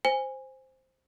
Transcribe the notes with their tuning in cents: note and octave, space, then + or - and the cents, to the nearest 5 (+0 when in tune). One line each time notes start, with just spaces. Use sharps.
C5 +0 G#5 -15